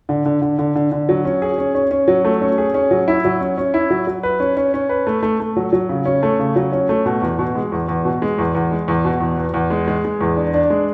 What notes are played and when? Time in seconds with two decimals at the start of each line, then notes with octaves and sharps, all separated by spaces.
0.09 D3
0.26 D3
0.42 D3
0.59 D3
0.76 D3
0.92 D3
1.09 F#3
1.25 C#4
1.42 G#4
1.58 C#4
1.75 C#4
1.91 C#4
2.08 F#3
2.25 A3
2.41 C#4
2.58 G#4
2.74 C#4
2.91 F#3
3.08 E4
3.25 F#3
3.41 C#4
3.58 C#4
3.74 E4
3.90 F#3
4.07 F#3
4.23 B4
4.40 C#4
4.57 C#4
4.74 C#4
4.89 B4
5.07 A3
5.23 A3
5.40 A3
5.56 F#3
5.73 F#3
5.89 C#3
6.06 C#4
6.23 A3
6.39 C#3
6.56 F#3
6.72 C#4
6.89 A3
7.06 B2
7.22 E2
7.39 B2
7.55 G#3
7.72 E2
7.88 E2
8.05 B2
8.22 G#3
8.38 E2
8.55 E2
8.71 G#3
8.88 E2
9.04 B2
9.21 E2
9.38 E2
9.54 E2
9.70 G#3
9.88 G#3
10.05 G#3
10.21 E2
10.37 D4
10.54 D4
10.70 G#3